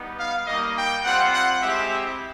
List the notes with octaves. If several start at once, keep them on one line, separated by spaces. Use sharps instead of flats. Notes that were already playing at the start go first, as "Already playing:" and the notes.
Already playing: G3 B3 D#4
F5
G3 A#3 D#4 D#5
G5
G3 C4 F4 F#5
F#5
G#3 C4 E4 G4 E5